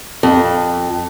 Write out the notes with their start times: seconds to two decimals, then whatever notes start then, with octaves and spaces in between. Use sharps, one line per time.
0.23 F2